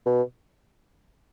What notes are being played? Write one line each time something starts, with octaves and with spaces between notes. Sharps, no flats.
B2